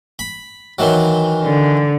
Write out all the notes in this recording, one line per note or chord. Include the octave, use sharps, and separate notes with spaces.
B5
D#3 E3 F#3
D3